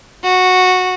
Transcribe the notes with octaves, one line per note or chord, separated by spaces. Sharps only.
F#4